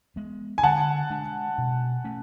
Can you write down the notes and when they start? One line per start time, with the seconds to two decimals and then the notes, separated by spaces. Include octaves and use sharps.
0.16 G#3 B3
0.58 G#5
0.63 D3 F#5 A5
1.10 G#3 D4
1.58 B2
2.04 A3 C#4